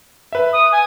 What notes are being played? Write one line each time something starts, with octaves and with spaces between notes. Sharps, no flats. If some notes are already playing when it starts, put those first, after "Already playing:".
B4 E5
D#6
G#5